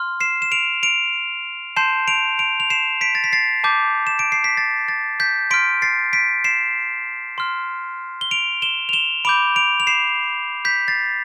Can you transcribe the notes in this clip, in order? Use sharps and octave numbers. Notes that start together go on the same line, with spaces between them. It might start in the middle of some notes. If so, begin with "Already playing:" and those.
Already playing: C6 F6
C7 E7
E7
D7 F7
D7 F7
A5 C6 G6 C7 E7
D7 F7
D7 F7
F7
C7 E7
B6 D7
A6
B6
A6 C7
A5 D6 G6
E7
D7
C7
B6
A6
A6
G6 B6
C6 F6 B6 D7
A6 C7
B6 D7
C7 E7
C6 F6
G7
D7 F7
E7 G7
F7
E7 G7
B5 D6 G6 D7 F7
D7 F7
F7
C7 E7
G6 B6
A6 C7